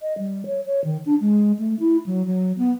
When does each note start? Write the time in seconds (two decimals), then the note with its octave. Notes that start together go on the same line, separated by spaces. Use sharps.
0.01 D#5
0.18 G3
0.46 C#5
0.66 C#5
0.84 D#3
1.06 D4
1.21 G#3
1.59 A3
1.80 E4
2.06 F#3
2.27 F#3
2.58 B3